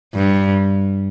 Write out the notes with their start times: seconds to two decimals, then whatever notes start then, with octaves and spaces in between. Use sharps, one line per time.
0.15 G2